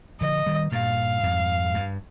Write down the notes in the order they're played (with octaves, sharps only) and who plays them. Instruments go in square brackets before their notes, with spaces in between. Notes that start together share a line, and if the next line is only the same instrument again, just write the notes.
[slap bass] D3 F3 [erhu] D#5
[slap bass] D#3 G3
[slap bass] G2 A#2 [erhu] F5
[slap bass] F2 G#2
G2